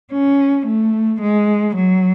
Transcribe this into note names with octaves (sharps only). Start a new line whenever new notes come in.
C#4
A3
G#3
F#3